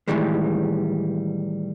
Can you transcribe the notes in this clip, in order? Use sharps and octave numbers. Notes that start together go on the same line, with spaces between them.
A2 C3 D#3 E3 G3 G#3